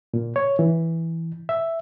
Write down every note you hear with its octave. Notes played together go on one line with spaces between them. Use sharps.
A#2
C#5
E3
E5